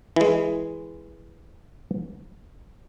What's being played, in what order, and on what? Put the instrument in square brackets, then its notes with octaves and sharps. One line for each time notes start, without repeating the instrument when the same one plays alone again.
[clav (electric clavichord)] E3 G#3